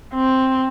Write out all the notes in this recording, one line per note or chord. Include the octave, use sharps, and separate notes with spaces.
C4